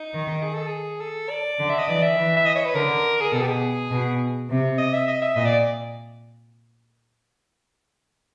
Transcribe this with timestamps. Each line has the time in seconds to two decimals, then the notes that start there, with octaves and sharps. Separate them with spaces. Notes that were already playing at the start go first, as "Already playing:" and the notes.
Already playing: D#4
0.14 D#3
0.42 G#4
0.54 A4
0.67 G#4
1.00 A4
1.30 D5
1.59 D3
1.69 E5
1.78 D#5
1.88 E3 D5
2.02 E5
2.16 E3
2.36 E5
2.46 D#5
2.55 C#5
2.65 B4
2.74 D3 A#4
3.21 G#4
3.33 B2 A4
3.42 G4
3.47 G#4
3.91 B2
4.49 C3
4.78 D#5
4.93 E5
5.08 D#5
5.22 E5
5.36 A#2 D#5
5.46 D5